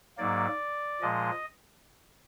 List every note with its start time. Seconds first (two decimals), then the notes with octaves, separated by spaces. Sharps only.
0.18 G#2 F#3 A#3 D5
1.01 A#2 F3 G#3 D#5